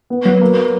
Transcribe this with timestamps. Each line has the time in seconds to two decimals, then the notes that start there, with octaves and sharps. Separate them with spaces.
0.10 B3
0.25 F#3 B3
0.41 A#3